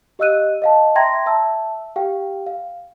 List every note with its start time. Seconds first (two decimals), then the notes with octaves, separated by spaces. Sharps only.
0.19 G4 D#5 F5 E6 F#6 D#7
0.62 D#5 F5 A5
0.95 E5 G5 A#5 C6 G#6 A#6
1.26 E5 A5 E6
1.96 G4 F5 G5
2.47 F5